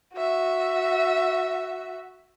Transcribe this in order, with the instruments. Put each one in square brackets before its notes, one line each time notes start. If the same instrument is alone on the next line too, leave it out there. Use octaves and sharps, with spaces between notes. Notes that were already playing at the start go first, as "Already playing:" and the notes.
[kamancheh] F#4 E5